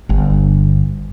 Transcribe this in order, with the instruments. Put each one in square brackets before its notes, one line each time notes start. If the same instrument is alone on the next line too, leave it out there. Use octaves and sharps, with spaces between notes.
[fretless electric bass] G1 G2